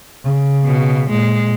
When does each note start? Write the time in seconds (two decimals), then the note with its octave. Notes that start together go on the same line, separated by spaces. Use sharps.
0.24 C#3
0.65 B2
1.10 A#2 G#3